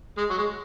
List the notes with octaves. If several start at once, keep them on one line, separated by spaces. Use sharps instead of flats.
G#3
F#3
G#3